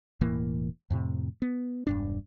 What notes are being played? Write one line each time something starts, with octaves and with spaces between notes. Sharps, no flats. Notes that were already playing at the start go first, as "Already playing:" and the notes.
E1 A2 E3 A#3
F2 A2 C3
B3
E1 G2 D4